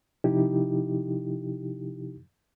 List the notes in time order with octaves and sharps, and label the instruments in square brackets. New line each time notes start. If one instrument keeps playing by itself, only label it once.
[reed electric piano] C3 F3 D#4 E4 G4